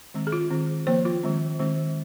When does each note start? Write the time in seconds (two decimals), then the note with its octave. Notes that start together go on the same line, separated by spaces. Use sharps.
0.14 D#3 G#3 C4
0.27 G#4
0.32 F4
0.50 D#3 C4
0.87 F3 A#3 C5
1.05 F4
1.23 D#3 G#3 C4
1.59 D#3 G#3 C4